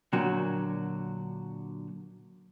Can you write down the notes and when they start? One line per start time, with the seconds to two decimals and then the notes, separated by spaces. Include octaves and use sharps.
0.13 A#2 D3 F#3 F#4